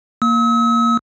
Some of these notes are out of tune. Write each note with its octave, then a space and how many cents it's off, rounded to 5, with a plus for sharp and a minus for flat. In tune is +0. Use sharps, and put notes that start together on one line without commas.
A#3 +0 E6 -45